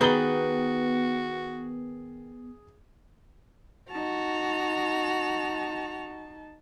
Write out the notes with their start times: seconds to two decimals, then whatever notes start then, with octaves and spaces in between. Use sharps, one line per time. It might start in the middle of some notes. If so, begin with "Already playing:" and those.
0.01 D#3 B3 F#4 G#4 B4 A6 G7
3.91 D#4 F#4 A5 F7